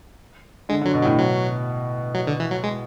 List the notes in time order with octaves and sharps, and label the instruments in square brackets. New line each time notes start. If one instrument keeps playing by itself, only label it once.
[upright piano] D3 [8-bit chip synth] G#3
[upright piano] D3
[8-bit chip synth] F#3
[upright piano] B2
[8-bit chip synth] F#3
[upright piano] A2
[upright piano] B2 [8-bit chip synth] F#3
[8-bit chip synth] F#3
D3
E3
F#3
G#3